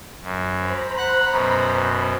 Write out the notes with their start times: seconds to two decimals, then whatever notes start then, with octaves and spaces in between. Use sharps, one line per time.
0.22 F#2
0.55 C5 A#5 B5
0.97 F#5 F#6
1.30 F#2 B2